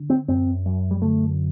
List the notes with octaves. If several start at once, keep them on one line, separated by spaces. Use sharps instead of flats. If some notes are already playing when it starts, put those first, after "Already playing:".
Already playing: D3
C4
F#2 C4
F#2
G3
D3 A3